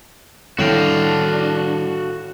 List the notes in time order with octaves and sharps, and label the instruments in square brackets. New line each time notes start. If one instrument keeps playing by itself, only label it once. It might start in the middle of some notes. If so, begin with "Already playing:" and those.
[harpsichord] A2 G5 [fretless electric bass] D#3 G3 C4 [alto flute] D4 [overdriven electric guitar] F#4 F5